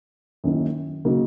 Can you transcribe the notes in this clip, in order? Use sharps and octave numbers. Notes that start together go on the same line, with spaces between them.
F#2 D#3 A#3 E4
C#3 F#3 A#3 D#4